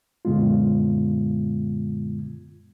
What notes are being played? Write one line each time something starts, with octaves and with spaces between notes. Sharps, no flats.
F#2 A#2 D3 G#3 B3 F4